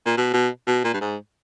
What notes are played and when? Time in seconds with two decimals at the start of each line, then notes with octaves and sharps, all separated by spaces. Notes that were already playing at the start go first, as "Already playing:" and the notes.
0.06 A#2
0.17 B2
0.33 B2
0.67 B2
0.84 A#2
0.93 G2
1.01 G#2